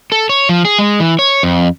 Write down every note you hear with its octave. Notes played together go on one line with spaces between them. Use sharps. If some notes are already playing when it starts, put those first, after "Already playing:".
A4
C#5
F3
G#4
G#3
E3
C#5
F2